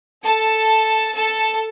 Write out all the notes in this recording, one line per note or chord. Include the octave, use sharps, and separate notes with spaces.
A4 A5
A4 A5